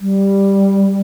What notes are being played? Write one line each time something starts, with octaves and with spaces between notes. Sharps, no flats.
G3